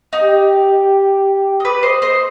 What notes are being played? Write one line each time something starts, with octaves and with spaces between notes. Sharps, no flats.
D#4
G4
D#5
B4 D5
C5 D#5
C5 D#5